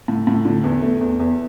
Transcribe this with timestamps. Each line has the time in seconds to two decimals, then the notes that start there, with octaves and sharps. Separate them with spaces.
0.08 A2
0.27 A2
0.45 D3
0.64 E2
0.82 A3
1.01 E2
1.19 E2